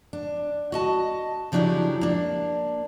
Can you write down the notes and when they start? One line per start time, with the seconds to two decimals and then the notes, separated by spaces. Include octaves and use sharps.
0.13 D4
0.72 F#4 D#5 A5
1.52 C#3 F3 F#3 D4 E4 G4
2.01 A#3 D4